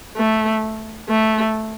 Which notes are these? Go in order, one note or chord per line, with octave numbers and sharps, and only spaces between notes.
A3
A3